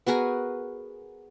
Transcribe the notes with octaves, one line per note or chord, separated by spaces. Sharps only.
B3 F#4 G#4 A#4